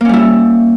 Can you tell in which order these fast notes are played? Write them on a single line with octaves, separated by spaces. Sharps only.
A#3 C#4 G3 E4